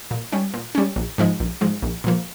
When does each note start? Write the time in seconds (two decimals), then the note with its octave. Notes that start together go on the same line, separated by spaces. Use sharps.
0.11 A#2
0.32 G3 C#4
0.54 A#2
0.75 G3 C#4
0.96 A#1
1.18 G#2 F3 G#3
1.40 A#1
1.61 G#2 F3 G#3
1.83 A#1
2.04 A#2 F3 A#3